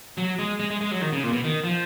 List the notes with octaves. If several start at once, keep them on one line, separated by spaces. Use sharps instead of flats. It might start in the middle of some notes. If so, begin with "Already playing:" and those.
F#3
G#3
G#3
G#3
G#3
F#3
D#3
C#3
A#2
B2
D#3
F3